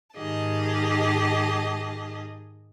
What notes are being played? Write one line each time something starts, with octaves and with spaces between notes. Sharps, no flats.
G#2 D#3 G4 G#4 D#5 A5